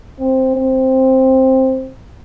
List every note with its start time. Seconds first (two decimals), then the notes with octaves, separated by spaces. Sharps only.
0.20 C4
0.56 C4